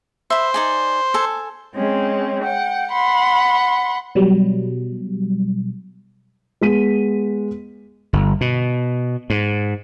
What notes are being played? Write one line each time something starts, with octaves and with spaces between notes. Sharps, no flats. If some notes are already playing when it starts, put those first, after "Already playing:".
C5 E5 B5
D#4 D5 G#5
A4 G#5
G#3 C4 C#4
F#5 G5
F#5 B5 C6
B2 F#3 G3
G#3 B3 B6 D#7
G1
B2
G#2